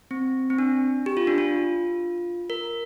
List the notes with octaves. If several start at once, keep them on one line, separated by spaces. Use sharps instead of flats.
C4
C4
D4
G4
F4
D4
F4
A#4